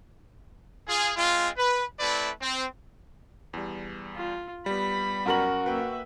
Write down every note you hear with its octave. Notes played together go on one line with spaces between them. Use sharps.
F4 G#4
G#3 C4 F4
B4
A3 C4 E4 B4 D5
C4
E2 G3
F4
G3 B3 B5
F#2 F#4 A#4 F#7
A#3 B4 E5 G5